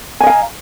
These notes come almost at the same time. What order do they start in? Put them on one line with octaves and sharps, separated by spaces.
G#5 D#5 F5 A#5